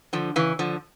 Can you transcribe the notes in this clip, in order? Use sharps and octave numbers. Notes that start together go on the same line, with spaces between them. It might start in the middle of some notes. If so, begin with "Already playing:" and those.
D3 F3
C#3 E3
D3 F3